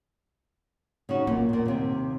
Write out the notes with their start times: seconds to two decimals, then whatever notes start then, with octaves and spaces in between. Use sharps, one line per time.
1.09 C#3 D#4 F#4
1.27 A#2 A#3
1.49 E2 A#2
1.65 D#2 C3